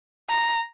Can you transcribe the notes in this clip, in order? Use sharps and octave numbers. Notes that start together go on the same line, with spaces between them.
A#5